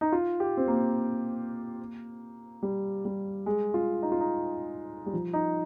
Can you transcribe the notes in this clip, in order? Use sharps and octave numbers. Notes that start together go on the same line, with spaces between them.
D#4
F4
G4
C4
A#3
G3
G3
G#3
F4
D#4
F4
D#4
G3
F3
D#4